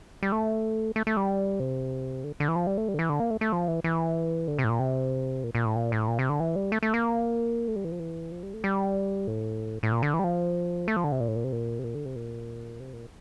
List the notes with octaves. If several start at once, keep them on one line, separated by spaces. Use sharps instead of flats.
G3
A3
A3
A3
G3
C3
D3
D3
E3
F3
G3
A3
G3
D3
E3
D3
A#3
A3
A3
F3
E3
E3
D3
C3
A2
A#2
C3
A#2
A#2
A2
A#2
A2
A#2
C3
D3
E3
G3
A3
A3
A#3
A3
G3
E3
F3
E3
F3
G3
A3
G3
A2
A2
A#2
D3
E3
G3
F3
A3
F3
D3
C3
A#2
A2
A#2
C3
A#2
C3
A#2
D3
C3
A#2
C3
A#2